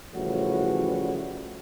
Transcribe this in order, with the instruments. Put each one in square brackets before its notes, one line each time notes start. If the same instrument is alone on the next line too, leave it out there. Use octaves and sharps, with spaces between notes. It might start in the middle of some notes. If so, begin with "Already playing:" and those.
[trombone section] A2 C#3 E3 F3 G3 F#4